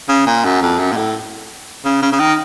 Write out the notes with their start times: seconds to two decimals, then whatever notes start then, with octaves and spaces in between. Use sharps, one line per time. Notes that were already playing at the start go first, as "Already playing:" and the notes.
0.09 C#3
0.26 A#2
0.44 F#2
0.62 F2
0.79 F#2
0.92 A#2
0.97 A2
1.85 C#3
2.02 C#3
2.12 C#3
2.20 D#3